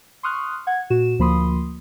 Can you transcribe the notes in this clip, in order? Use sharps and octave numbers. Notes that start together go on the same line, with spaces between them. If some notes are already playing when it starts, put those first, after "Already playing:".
C6 C#6 D#6 F6 F#6
F#5 G#6
A#2 F#4 E7
D2 F3 A#3 B5 C6 D#6